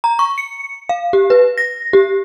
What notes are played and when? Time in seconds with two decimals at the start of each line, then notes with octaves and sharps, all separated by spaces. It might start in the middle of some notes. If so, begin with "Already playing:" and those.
0.04 A#5
0.19 C#6
0.38 C#7
0.89 F5
1.13 G4
1.30 B4
1.58 A#6
1.93 G4